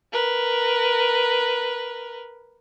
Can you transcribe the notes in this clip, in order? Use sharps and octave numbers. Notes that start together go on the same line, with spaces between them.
A#4 B4